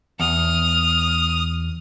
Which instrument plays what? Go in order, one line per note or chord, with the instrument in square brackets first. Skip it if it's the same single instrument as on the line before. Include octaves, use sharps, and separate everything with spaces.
[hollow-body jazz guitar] E2 [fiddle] D#6 F6